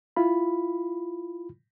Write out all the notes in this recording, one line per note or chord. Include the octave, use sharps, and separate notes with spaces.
E4 F4 B5